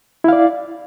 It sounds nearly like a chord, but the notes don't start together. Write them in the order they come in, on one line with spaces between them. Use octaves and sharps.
E4 F5 D5